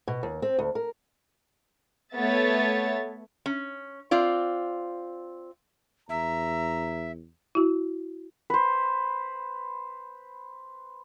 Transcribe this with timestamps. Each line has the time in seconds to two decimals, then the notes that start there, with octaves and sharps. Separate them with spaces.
0.08 B2
0.23 D#2
0.42 C4
0.59 D2
0.75 A#4
2.14 A3 B3 C#5 E5 A6
3.46 C#4
4.11 C4 F4 D5
6.09 E2 E5 A#5
7.55 E4 F#4
8.50 B4 C5